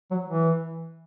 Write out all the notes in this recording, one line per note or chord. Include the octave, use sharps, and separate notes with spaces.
F#3
E3